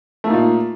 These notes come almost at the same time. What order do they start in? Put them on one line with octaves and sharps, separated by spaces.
A3 A#3 D#4 A#2